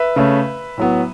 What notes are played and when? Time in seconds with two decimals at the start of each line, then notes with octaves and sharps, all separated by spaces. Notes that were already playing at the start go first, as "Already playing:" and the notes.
Already playing: B4 E5
0.16 C#3 A3 C#4
0.78 A2 F#3 B3